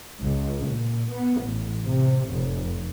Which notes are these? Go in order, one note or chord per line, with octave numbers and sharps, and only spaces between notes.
C#2
A#2
B3
A1
C3
F1